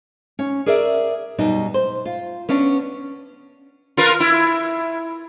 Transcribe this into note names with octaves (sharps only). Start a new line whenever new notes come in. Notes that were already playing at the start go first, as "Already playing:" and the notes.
C#4
G#4 A#4 D5 E5
F#2 B2 G3 D#4
C5
F4
B3 C#4 D4
F4 A#4 B4
E4